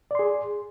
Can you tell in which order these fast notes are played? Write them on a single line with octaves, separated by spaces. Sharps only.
D5 C6 G#4